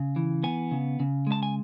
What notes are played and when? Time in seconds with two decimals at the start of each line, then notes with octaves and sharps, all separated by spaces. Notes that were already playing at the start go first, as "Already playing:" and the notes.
Already playing: C#3
0.16 E3
0.43 B3 G#5
0.71 C#3
1.00 C#3
1.27 G#3
1.32 A5
1.43 G#5